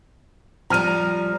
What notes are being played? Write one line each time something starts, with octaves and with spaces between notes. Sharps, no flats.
F3 G3 A#5 F6 D#7